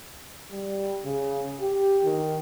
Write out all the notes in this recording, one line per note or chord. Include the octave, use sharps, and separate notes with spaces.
G3
C#3
G4
D#3